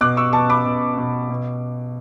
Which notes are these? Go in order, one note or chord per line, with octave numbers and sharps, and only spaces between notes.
B2 D6 F#6
C#6 E6
B2 A5 C#6
B5 D6
B2
B2
B2